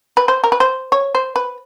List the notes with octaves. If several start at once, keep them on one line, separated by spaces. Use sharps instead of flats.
B4
C5
A#4
B4
C5
C#5
C5
B4